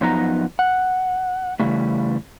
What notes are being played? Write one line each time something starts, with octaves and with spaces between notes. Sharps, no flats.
F#2 F3 B3 D#4 A#5
F#5
C#3 E3 G3 A3